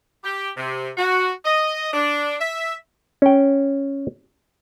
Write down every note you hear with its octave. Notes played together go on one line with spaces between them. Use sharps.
G4
C3
F#4
D#5
D4
E5
C#4 G5